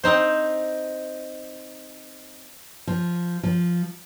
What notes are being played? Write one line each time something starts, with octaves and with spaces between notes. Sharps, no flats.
C4 D#4 C5
F3
F3